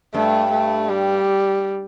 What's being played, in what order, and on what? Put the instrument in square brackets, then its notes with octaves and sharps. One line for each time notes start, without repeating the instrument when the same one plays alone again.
[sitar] G2 [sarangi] A3
[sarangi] A3
G3